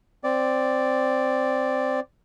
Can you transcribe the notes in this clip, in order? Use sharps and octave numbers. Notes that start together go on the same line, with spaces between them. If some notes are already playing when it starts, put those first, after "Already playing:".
C4 D5